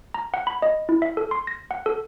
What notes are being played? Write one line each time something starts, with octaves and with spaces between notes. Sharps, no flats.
A#5
F#5
B5
D#5
E4
E5
A4
C6
A#6
F#5
A4